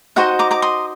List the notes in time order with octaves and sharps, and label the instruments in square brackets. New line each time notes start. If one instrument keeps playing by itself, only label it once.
[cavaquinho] D#4 F#4 C5 D#5 F#5
A#5 D6
A#5 D6
C6 D#6